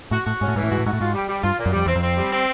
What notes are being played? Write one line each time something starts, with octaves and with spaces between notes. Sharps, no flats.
A2 F#4
A2 F#4
G#2 C#4
A2
G#2 E3
A2
G#2 F#4
A2
G#2 F#4
A2
G#2 F4
G3
G3
G2 F4
A#2
F#2
F2 G3
E2 C4
F2
C4
G3
C4